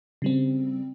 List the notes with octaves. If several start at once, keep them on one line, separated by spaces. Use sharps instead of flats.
C#3 G3 C4